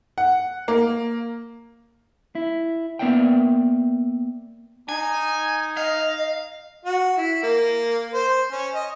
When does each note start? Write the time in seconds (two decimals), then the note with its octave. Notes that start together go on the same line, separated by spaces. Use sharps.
0.18 F#5
0.68 A#3
2.35 E4
2.99 A#3 B3 A#4 D5 E5 G5
4.89 D#4 G#5
5.77 D#5 F5
6.85 F#4
7.17 E4
7.43 A#3
8.14 C5
8.52 C#4
8.75 D#5